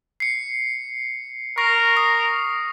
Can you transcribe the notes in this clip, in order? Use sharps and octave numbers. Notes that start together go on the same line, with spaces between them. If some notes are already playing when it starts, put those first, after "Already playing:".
C7 C#7
A#4 C#6 A#6 C7
D#6